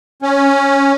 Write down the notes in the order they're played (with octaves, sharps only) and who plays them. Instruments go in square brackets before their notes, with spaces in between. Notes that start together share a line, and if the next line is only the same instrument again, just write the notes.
[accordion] C#4